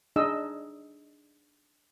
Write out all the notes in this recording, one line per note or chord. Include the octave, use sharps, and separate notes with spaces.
D4 D#4 G#4 D#5 E6